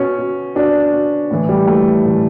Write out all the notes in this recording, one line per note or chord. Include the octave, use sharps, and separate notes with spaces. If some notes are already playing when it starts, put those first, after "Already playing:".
Already playing: B2 C#4
B2
B2 D4
B2
A2 E3
G3
A2 E3 A3
A2 E3